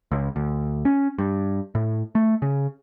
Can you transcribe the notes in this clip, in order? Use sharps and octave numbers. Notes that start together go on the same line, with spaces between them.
C#2
D2
C#4
G2
A2
A3
C#3